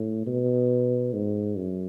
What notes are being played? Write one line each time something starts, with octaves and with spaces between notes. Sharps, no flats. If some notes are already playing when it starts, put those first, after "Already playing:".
Already playing: A2
B2
G#2
F#2